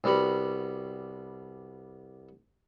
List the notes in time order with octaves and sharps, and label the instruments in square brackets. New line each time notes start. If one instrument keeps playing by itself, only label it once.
[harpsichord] C2 G3 B3 F#4 B5